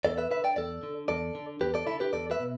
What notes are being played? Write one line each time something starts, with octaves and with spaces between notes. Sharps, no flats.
E2 A4 D5
B4 E5
D3 B4 E5
D5 G5
E2 A4 D5
D3
E2 A4 D5
D3
E2 G4 B4
A4 D5
D3 E4 A4
G4 B4
E2 A4 D5
B4 E5
B2